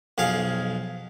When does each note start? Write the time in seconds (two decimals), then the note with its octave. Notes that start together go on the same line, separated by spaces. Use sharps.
0.18 B1 F2 G#4 F5